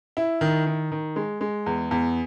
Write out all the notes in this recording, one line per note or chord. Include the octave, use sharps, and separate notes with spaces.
E4
D#3
D#3
D#3
G#3
G#3
E2
E2